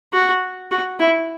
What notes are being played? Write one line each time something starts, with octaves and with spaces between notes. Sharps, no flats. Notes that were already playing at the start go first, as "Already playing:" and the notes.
F#4
F#4
E4